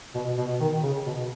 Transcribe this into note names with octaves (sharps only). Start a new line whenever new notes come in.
B2
B2
D#3
C#3
B2